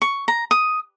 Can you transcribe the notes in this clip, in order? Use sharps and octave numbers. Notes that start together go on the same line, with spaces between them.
C#6
A#5
D#6